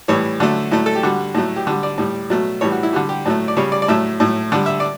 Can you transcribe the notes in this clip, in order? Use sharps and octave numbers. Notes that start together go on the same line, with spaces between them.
A2 E3 G3 C#5
D3 F#3 A3
A2 F#3 A3 E4
A4
G4
D3 G3 F#4
A2 F#3 A3
G4
D3 G3 F#4
D5
A2 G3
B2 F#3 A3
A2 E3 G3 C#5
F#4
E4
D3 G3 F#4
G4
A2 F#3 A3
D5
C#3 G3 C#5
D5
D5
A2 F#3 A3 E5
A2 F#3 A3
D3 G3 D5
E5
D5